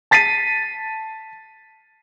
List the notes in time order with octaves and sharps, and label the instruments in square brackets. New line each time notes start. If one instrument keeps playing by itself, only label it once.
[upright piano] A5 A6 B6 C7 D#7